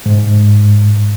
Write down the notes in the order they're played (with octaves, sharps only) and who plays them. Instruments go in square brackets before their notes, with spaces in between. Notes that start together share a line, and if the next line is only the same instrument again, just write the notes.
[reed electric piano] G#2